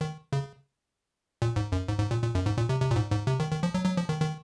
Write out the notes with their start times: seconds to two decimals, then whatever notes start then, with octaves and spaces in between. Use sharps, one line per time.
0.01 D#3
0.33 C#3
1.42 A#2
1.56 G#2
1.72 F#2
1.88 G#2
1.99 G#2
2.11 A#2
2.22 A#2
2.35 F#2
2.46 G#2
2.58 A#2
2.69 C3
2.81 C3
2.91 A#2
2.96 G#2
3.12 G#2
3.27 C3
3.40 D#3
3.51 D#3
3.63 F3
3.74 F#3
3.85 F#3
3.97 F3
4.09 D#3
4.21 D#3